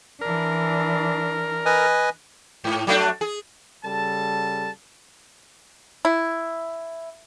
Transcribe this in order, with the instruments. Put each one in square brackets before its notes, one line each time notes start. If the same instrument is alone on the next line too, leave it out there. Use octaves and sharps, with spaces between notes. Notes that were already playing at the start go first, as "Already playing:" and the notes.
[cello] E3 D4 [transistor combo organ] A#4
[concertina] B4 D#5 G#5
[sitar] G#2
F#3 A3 D4
G#4
[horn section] C#3 G3 A4 A5
[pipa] E4